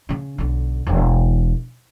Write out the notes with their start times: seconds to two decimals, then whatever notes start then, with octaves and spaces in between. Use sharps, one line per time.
0.09 C#3 C#4
0.38 B1 D3
0.87 E1 E2